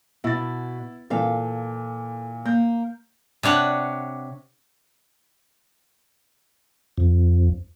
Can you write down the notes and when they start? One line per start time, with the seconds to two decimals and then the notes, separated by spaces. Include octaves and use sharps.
0.24 B2 E4 A6
1.10 A#2 E3 A4 F5
2.45 A#3 G6
3.43 C3 D4 C#5 F#5
6.98 F2